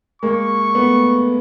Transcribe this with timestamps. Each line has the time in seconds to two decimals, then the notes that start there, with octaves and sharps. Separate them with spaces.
0.22 G#3 A#3 C#6
0.75 A3 B3